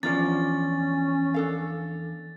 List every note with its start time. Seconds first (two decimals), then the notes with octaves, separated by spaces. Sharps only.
0.03 E2 F3 C#4 D4 F4 D5 A6
1.34 D4 A4 F5